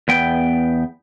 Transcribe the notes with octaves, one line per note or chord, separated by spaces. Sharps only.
E2 B3 G5